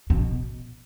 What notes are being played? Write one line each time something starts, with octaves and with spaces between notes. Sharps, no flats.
B2